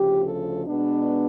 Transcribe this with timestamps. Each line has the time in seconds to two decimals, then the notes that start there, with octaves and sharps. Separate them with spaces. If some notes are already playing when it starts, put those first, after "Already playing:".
Already playing: D2 C#3 F3 G4
0.23 A4
0.66 B2 G#3 B3 D4